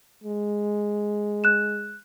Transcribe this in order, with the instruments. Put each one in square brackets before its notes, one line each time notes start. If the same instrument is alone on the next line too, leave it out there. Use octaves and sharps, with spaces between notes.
[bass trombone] G#3
[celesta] F#6 E7